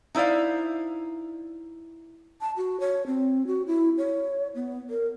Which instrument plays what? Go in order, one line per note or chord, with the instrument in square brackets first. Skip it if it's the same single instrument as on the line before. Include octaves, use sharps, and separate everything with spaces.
[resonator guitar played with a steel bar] D#4 E4 C5 D5 F5
[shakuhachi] A5
F#4
C#5
C4
F#4
E4
C#5
B3
A#4